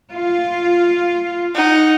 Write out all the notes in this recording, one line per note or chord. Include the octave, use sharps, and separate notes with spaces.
F4
D#4 F#5